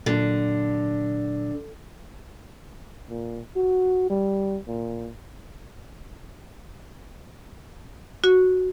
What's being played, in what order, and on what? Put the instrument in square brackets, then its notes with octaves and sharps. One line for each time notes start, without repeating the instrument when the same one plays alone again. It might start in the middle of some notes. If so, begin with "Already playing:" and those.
[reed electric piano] A#2 F#3 [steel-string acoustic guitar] D3
[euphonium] A#2
F#4
G3
A#2
[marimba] F#4